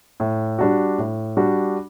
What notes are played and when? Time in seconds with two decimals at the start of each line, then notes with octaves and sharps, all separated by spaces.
0.20 A2
0.59 G3 D4 F#4
0.98 A2
1.37 G3 D4 F#4